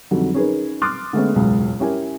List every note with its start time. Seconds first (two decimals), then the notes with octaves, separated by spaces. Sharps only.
0.11 F2 D3 D#3 F#3 G3
0.34 C#4 D#4 G#4 A#4 B4
0.82 C6 D6 D#6 F6 F#6 A6
1.13 D3 G#3 A3 B3 C#4
1.35 E1 C#2 F#2
1.80 C#4 E4 G4 A#4 G#5